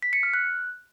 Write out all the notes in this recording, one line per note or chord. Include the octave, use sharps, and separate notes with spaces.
B6
C#7
F6
F#6